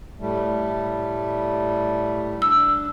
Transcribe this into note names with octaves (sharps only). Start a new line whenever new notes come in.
A2 G3 A3
D4 E6